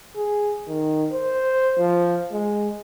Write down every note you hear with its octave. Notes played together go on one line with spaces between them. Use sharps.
G#4
D#3
C5
F3
G#3